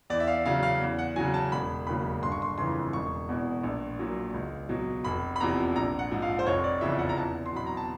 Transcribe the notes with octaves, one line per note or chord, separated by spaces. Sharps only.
E2 D5
E5
F5
C#3 F#3 F5
F5
E2
F#5
C#3 F#3 G#5
A5
E1 B5
D#2 C#3 F#3 B5
G1 C6
C#6
C6
F2 C#3 E3 C6
E1 C#6
E2 B2
A#1
A#2 F#3
C#2
B2 F#3
F1 B5
B5
E2 C3 F3 A#5
A#1 A#5
F#5
G#2 F3
F5
C5
F1 C#5
D5
E2 C#3 F3 E5
F#5
A#5
E2 A5
C6
B2 F#3 B5
A#5
A5